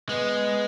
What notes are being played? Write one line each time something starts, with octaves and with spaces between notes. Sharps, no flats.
G#3 B3